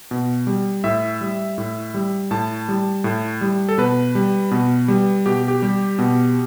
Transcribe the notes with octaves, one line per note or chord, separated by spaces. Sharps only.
B2
G3
A2 E5
G3
A2
G3
A2 A5
G3
A2
G3
A4
B2 B4
G3
B2
G3
B2 G4
G4
G3
B2